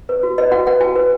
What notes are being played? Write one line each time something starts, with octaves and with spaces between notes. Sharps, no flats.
B4
F#4
B4 D#5
F#4 F#5
B4 F#5
F#4 G#5
B4